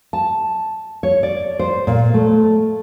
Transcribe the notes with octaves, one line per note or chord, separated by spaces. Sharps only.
A5
C#5
D5
C5
A#2
A3